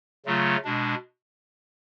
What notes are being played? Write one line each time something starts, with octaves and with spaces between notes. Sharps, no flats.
C#3 F#3 A3 F4
B2 G#3 D4